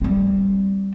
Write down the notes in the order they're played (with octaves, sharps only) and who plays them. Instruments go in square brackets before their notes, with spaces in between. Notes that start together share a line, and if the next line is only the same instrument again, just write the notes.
[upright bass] G3 C4